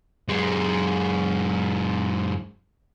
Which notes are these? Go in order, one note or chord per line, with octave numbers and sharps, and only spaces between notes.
F#2 G#3